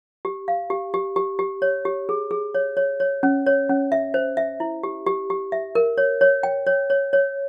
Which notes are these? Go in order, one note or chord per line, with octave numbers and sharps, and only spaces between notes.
G4
F5
G4
G4
G4
G4
C#5
G4
G#4
G#4
C#5
C#5
C#5
C#4
C#5
C#4
E5
C5
E5
E4
G4
G4
G4
E5
A#4
C#5
C#5
G5
C#5
C#5
C#5